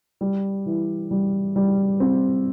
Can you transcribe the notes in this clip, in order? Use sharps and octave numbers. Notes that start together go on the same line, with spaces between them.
G3
E3
G3
G3
C4